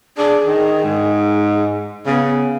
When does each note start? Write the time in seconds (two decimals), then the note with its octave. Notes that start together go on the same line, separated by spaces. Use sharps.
0.18 D4 G#4
0.45 D#3
0.84 G#2
2.06 C#3 B3